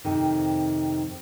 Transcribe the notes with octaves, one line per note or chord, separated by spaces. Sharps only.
F2 C3 D#3